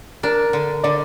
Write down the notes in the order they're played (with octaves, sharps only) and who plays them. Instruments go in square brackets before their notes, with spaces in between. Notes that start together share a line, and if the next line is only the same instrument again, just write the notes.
[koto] D4 [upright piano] A#4
[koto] D3
[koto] D3 [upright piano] D5